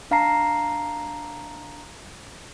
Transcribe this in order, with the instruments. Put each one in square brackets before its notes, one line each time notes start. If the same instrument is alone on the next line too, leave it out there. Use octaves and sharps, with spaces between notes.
[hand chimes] D4 F5 A5 A#5 C7